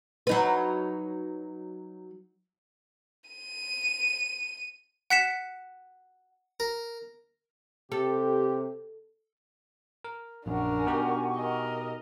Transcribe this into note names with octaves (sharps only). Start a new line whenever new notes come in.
F#3 D#4 B4
D#7
F#5 F#6 B6 C#7 E7
A#4
C3 G4 A4
A#4
A#1 F#2 D4 A#4 F#5 G#5 C#6
B2 D#4 G4
A#4 D#5